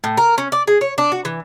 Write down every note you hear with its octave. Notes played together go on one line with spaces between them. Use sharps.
A2
A#4
C#4
D5
G#4
C#5
D4
F#4
E3